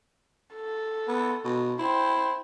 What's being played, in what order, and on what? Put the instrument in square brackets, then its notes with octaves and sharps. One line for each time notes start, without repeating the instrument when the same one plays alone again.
[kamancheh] A4
[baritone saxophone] B3
B2
[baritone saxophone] E4 [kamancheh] C5 G5